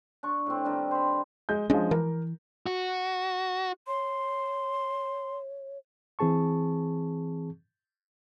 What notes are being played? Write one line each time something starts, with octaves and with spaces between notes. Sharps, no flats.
D4 C#6
A2 C4
D#3 G3 D4
C5 B5
G#3 G6
F3 G#3 C#4 D4
E3 A#4
F#4
C#5 C6
E3 C4 G#4 A5 C#6